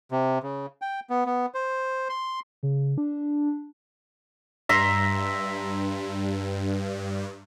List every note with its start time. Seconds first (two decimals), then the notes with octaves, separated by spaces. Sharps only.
0.11 C3
0.43 C#3
0.82 G5
1.10 B3
1.26 B3
1.54 C5
2.09 C6
2.63 C#3
2.98 D4
4.69 G2 E5 A#5 C6